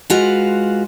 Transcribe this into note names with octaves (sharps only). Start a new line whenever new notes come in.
G#3 F4 F#4 B4 F5